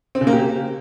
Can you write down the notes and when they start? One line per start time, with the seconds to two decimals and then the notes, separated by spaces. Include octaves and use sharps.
0.15 C4
0.21 C#3
0.27 A#3
0.33 G4